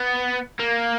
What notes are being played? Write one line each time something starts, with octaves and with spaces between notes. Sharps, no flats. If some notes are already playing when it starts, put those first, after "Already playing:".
Already playing: B3
A#3